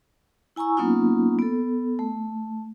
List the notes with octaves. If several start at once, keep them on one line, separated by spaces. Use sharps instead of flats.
E4 G#5 A#5 C#6 E6
F#3 A#3 B3 C#4 D#4 F4
B3 A4
A3